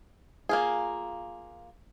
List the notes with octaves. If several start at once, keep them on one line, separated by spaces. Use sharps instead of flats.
A#3 F4 G#4